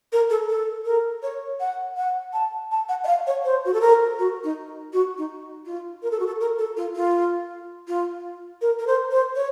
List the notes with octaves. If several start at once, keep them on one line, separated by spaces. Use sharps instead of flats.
A#4
A4
A4
A#4
C#5
F#5
F#5
A5
A5
F#5
D#5
F5
C#5
C5
F#4
A4
A#4
F#4
D#4
F#4
D#4
F4
A#4
A4
F#4
A4
A#4
A4
F4
F4
F4
A#4
A#4
C5
C5
C#5